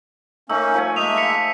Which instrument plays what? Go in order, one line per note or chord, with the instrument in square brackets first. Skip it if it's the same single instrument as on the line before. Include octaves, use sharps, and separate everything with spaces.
[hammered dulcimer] A3 D#4 [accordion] A#3 C#4 [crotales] E6
[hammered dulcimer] F3 A3 G#5
[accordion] G#3 A#3 E5 [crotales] D#6 D#7 F7
[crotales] B6 C#7 F7